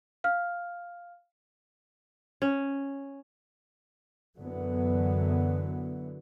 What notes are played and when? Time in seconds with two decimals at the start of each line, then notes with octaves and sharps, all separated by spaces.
0.24 F5 F6
2.42 C#4
4.37 F#2 D3 E3 F#3 B3